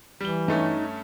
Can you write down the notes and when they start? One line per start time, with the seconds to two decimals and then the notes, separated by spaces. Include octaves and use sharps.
0.20 E3 G3 G7
0.48 G2 A3 C#4 D#4